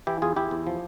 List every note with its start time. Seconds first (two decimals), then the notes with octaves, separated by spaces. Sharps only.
0.07 E3 E4 G4
0.22 E2 F4 G#4
0.36 E2 E4 G4
0.51 E2
0.67 F3